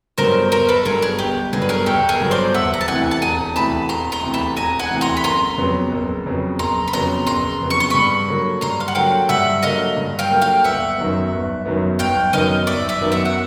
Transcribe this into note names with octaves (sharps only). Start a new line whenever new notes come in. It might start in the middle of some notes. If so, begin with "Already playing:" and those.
G2 D3 F#3 B3 A#4 C5
G1 A#4 C5
A4 B4
G2 D3 F#3 B3 G#4 A#4
G#4
G1 G4
G2 D3 F#3 B3 G#4
B4
G#4 A#4
G1 G4 A4
G#4 A#4
G2 D3 F#3 B3
C5 D5
E1 E5 F#5
A#5
A5
D2 C3 E3 F#5 G#5
A5
E1 G#5 A#5
D2 C3 E3 A5 B5
E1 A#5 C6
A#5 C6
D2 C3 E3
A5 B5
E1 G#5 A#5
F#5 G#5
D2 C3 E3
A#5 C6
B5
F#1 A#5 C6
F2 C#3 F#3 B3
F#1
F2 C#3 F#3 B3
F#1 A#5 C6
B5
F2 C#3 F#3 B3 A#5 C6
F#1 A#5 C6
F2 C#3 F#3 B3
C#6
C6
G2 B5 C#6
D3 F#3 A#3
G2 A#5 C6
F5
F#5
D3 F#3 A#3 F5 G5
G2 E5 F#5
D3 F#3 A#3 D#5 F5
G2
F5 G5
D3 F#3 A#3
F5 G5
G1 E5 F#5
F#2 D#3 F#3 B3
G1
F#2 D#3 F#3 B3
G1 F5 G5
F#2 D#3 F#3 B3 D#5 F5
G1 D5 E5
D5 E5
F#2 D#3 F#3 B3
E5 F#5
F#5